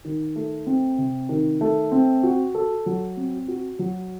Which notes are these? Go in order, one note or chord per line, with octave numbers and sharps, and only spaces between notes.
D#3
A3
C4
C3
D#3
A3
C4
F#4
A4
F#3
C4
F#4
F#3